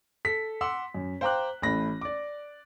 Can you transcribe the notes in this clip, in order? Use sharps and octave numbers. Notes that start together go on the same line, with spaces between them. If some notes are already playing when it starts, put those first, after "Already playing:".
A4 B6
F#5 C6 D6 E6
F#2
C5 F5 G5 A#5 D6 F#6
A1 A3 B5 A#6
D5 D6